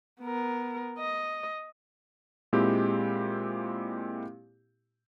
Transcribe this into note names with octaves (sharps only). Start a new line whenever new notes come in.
B3 A#4
D#5
A#2 G#3 C4 E4 G4